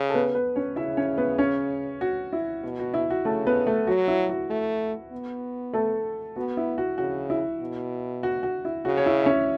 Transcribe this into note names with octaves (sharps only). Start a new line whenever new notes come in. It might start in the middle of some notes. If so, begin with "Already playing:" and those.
Already playing: C#3
A4
B3 B4
B3 B4
C#4 C#5
C#3 E4 E5
C#4 C#5
B3 B4
C#4 C#5
F#4
E4
B2
F#4
E4
F#4
C#3 A3 A4
B3 B4
A3 A4
F#3 F#4
E4
F#4
A3
B3
A3 A4
B3 F#4
E4
F#4
C#3 F#4
E4
B2
F#4
F#4
E4
C#3 F#4
C#5
E4 E5
E5
C#4 C#5